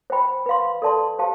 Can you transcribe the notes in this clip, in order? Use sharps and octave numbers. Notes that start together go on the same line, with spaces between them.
C5 G5 B5
B4 F5 C6
A4 D5 A5 C6
G4 C5 F5 A5